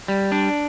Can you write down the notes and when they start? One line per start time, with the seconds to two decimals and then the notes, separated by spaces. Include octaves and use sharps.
0.08 G3
0.32 D4